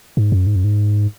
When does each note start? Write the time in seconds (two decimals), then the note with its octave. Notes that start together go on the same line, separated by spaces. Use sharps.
0.17 G#2
0.32 F#2
0.47 G#2
0.56 F#2
0.64 G#2